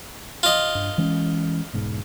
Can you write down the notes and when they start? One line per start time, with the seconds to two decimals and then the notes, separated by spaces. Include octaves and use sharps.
0.43 F4 D#5
0.75 G2
0.98 E3 G#3 C#4
1.73 E1 G#2 B2